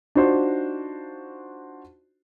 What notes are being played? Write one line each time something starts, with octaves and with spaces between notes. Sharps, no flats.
D4 D#4 F4 F#4 C5